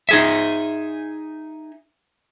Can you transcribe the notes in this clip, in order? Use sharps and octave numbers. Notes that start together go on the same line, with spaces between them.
D#4 G#4 E5